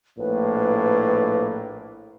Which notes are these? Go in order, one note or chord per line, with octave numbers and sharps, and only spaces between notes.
A#1 A2 A#3 B4